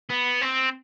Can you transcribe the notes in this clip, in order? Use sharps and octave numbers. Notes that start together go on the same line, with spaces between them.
B3
C4